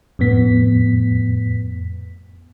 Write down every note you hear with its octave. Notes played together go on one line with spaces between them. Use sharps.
F2 A2 B3 B6